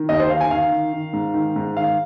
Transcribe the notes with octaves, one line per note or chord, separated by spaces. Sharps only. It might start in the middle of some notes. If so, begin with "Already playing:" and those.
Already playing: D#3
D#2 D#5
C5
D#3 F5
G#5
D#3 F5
D#3
D#3
G#2
D#3
G#2
D#3 F5